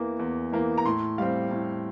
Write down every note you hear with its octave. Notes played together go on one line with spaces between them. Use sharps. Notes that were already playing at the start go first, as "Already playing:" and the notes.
Already playing: E2 E3 A#3
E2
E3 A#3
A#5
A2 C6
G3 C4 F5
A2